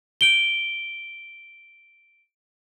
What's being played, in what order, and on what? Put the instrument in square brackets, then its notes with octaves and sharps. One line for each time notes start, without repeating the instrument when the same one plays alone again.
[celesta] D7 G7